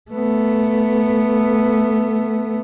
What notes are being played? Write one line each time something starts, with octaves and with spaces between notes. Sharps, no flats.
A3 B3